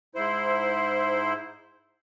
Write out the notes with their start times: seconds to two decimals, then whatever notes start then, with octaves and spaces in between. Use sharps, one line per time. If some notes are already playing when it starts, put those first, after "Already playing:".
0.15 G#2 E4 C5